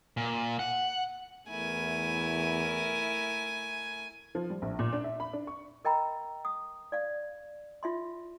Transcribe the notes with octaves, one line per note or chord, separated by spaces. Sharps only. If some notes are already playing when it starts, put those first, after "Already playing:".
A#2
F#5
E2 A3 E4 A#4 G#5
F3
G3
A#1
A#2
D4
E5
B5
D4
C#6
A#4 D#5 G5 A#5 B5
D#6
D5 F5
F4 E5 C6